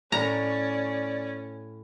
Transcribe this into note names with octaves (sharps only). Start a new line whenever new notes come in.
A2 C#4 D5 A#5